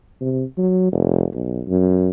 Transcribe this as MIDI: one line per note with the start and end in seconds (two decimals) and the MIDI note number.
0.21 0.43 48
0.58 0.89 54
0.93 1.25 29
1.33 1.62 35
1.67 2.09 42